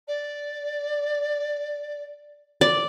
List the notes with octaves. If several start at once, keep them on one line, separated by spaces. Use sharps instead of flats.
D5
D5